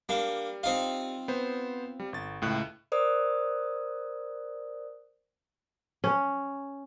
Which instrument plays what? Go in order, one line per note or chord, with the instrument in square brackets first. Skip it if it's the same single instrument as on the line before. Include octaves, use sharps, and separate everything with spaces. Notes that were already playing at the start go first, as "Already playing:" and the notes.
[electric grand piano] G3 [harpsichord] A#3 D4
[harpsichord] C4 D#4 F4
[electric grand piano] B3 C5
G3
G1 A6
C#2 A2 F#6
[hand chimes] A#4 C5 D5 D#6
[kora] C#4